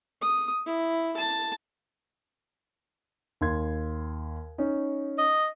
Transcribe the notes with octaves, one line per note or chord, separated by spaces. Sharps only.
D#6
E4
A5
D#2 C6 G#6
C#4 D#4
D#5